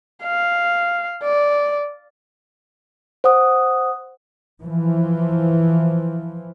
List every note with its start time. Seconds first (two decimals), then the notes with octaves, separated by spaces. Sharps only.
0.23 F5
1.23 D5
3.24 C5 F#5 D#6
4.62 E3 F3